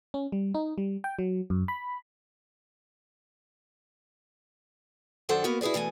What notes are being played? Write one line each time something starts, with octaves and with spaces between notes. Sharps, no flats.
C#4
G3
D#4
G3
G5
F#3
F#2
B5
F#2 D#3 D4 A4 C5 F#5
A#3 B3 F#4 A#4 B4
E4 F#4 G#4 B4 D5
B2 E3 A3 G#5